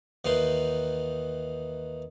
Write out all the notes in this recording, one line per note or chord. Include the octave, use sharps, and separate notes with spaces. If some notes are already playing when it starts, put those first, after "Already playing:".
D#2 D#3 E3 C6